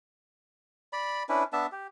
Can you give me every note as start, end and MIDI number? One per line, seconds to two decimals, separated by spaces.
0.93 1.23 74
0.93 1.23 83
1.29 1.44 61
1.29 1.44 62
1.29 1.44 64
1.29 1.44 71
1.53 1.67 59
1.53 1.67 62
1.53 1.67 76
1.53 1.67 81
1.72 1.87 67